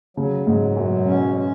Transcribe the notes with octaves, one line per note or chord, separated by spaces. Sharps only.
C#3 F#3
G#2 F#3
F#2 B2
C#4
C#4